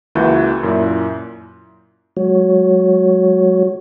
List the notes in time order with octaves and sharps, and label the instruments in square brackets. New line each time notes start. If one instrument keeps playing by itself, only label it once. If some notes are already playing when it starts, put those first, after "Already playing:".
[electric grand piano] C#2 E3 A#3 F#4 E5 G6
F#2 A#2 E4
[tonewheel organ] F#3 G#3 F#4 C#5